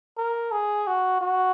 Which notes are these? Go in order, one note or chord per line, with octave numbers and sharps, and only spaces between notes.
A#4
G#4
F#4
F#4